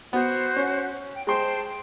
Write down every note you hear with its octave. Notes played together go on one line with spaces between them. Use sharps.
B3 F#4 C5 F#5
C#4
G5
G#3 C5 G5 A5 C6